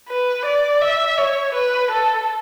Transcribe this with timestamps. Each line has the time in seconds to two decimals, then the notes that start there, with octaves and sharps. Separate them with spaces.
0.08 B4
0.45 D5
0.82 E5
1.18 C#5
1.55 B4
1.91 A4